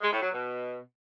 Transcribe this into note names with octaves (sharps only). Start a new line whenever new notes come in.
G#3
A2
F#3
B2